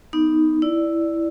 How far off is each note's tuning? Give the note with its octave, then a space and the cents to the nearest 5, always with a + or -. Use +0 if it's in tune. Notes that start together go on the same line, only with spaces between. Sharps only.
B3 +0 D#4 +0
E4 +0 D5 +0